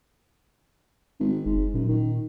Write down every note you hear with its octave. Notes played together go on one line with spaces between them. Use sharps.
G#1
F#1 G#2
F#2 A#2
D#3